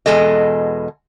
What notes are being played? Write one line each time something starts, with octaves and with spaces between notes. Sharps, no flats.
E2 B2 G#3 A4 D#5